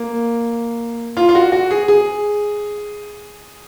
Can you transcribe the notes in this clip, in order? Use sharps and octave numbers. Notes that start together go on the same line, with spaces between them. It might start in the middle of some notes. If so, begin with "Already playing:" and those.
Already playing: A#3
F4
F4
F#4
F#4
G#4
G#4